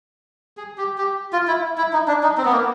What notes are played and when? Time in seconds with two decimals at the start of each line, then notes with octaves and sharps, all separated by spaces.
0.57 G#4
0.78 G4
0.98 G4
1.33 F4
1.47 E4
1.78 E4
1.93 D#4
2.08 D4
2.23 D#4
2.38 C4
2.45 B3
2.52 A#3